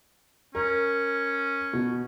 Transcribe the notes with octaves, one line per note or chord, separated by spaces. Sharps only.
C#4 A#4
B2